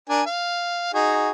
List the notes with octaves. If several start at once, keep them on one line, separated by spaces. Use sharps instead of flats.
D4 A#4 G#5
F5
D#4 F#4 G#4